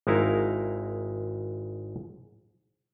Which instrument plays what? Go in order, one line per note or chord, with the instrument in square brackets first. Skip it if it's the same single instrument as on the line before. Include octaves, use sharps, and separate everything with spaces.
[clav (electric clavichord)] G#1 G#3 D#4 E4 A#4 F5